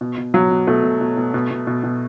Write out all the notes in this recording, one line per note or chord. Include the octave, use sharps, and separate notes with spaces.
B2
B2
B2 F#3
B2
B2 A3
B2
B2
B2
B2
B2
B2
B2